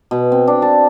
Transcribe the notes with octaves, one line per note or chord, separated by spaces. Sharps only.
B2
C4
D4
A5